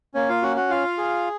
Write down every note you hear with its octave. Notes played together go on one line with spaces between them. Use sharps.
A#3 C#4 C#5
F4 F5
C#4 F#4 F#5
F#4 F#5
F4 F5
G#4